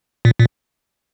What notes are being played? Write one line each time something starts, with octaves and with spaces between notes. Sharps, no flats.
A#2
A#2